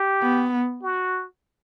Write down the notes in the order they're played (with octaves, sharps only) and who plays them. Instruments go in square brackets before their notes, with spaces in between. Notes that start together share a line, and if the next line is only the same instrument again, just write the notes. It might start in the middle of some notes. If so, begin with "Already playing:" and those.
Already playing: [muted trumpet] G4
[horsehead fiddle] B3
[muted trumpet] F#4